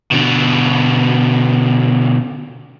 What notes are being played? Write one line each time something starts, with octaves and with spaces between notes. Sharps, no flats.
B2 D3